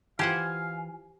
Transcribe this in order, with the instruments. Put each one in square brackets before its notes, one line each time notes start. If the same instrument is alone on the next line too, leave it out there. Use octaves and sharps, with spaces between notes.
[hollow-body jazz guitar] E3 F4 [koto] G4 C5 F#5 [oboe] F5 [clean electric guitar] G#5